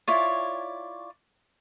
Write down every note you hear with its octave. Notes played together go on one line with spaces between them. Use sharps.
E4 F4 C#5 D5